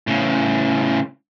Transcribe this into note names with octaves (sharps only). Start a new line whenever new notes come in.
A2 C#3